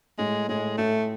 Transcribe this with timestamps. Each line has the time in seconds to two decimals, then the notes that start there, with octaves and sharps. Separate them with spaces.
0.18 A2 G#3
0.49 A2 G#3
0.78 A2 A3